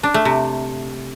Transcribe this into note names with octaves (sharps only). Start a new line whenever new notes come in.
D4
A3
C3